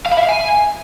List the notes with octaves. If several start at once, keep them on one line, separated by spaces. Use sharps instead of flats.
F5
B5
E5
F5
G#5